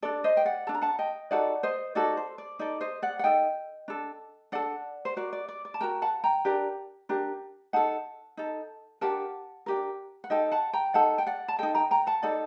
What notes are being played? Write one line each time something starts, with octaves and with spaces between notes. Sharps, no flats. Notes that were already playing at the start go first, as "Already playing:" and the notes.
D4 A4 D5
C5 D#5
G5
D5 F#5
D4 A4 A5
A#5
F#5 A5
D#5 G5
D#4 F#4 A4 D5 F#5
C5 D#5
D#4 F#4 A4 D5
C5
D5
D#4 A4 D5
C5 D#5
D5 F#5
F#5
D#4 A4 D#5 G5
D4 A4
D4 A4 D5 F#5
C5
F#4 A#4 D5
D5
D5
D5
A5
F#4 A#4 G5 A#5
F#5 A5
G5 A#5
D4 G4 A#4
D4 G4 A#4
D#4 A4 F#5 A5
D#4 A4
D4 G4 A#4 F#5 A5
D4 G4 A#4
F#5
D#4 A4 D#5 G5
F#5 A5
G5 A#5
D#4 A4 F#5 A5
G5
D5 F#5
A5
D#4 A4 D#5 G5
G5 A#5
G5 A#5
F#5 A5
D#4 A4 D5 F#5